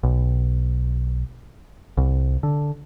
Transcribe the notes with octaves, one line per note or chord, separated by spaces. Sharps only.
B1
C2
D3